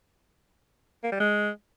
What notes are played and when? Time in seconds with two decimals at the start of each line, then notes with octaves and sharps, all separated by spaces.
1.04 A#3
1.12 G3
1.20 G#3